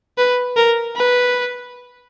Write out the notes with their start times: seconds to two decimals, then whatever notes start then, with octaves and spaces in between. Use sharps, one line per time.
0.18 B4
0.57 A#4
0.96 B4